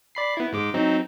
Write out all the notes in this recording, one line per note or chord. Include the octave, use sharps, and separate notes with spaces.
D5 B5 C7
B3 E4
G#2 G#3 D6
F#3 C4 D#4